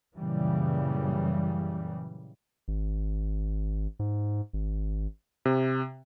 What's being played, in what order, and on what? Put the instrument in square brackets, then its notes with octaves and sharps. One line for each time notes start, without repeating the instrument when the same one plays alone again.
[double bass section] F#2 A#2 C#3 E3 G3
[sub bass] G#1
G#2
G#1
[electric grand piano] C3